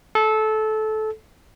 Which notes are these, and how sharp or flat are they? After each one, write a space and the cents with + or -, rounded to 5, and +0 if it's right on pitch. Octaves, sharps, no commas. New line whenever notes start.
A4 -20